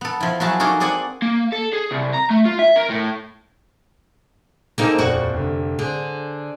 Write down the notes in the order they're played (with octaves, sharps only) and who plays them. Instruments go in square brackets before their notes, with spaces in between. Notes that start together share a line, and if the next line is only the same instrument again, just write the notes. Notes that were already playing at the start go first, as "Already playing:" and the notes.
[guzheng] B3 A4
F3 E4
F3 F#3 E4 F#4 G#4 A5
A#3 D#4 F#4 G#4 A4
C4 G#4 D5 F#5 G#5
[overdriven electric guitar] A#3
A4
G#4
C2
A#5
A3
F4
E5
A#4
A2
[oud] A#3 C4 D#4 [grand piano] G#4 A4
[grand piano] D#1 F2 D5 [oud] F#4
[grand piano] F1 D3
[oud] D3 [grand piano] G#4 C5